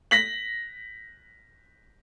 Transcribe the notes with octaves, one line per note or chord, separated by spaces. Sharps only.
A#6 B6 F#7